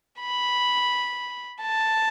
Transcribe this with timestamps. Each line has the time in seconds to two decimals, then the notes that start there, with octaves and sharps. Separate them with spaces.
0.20 B5
1.62 A5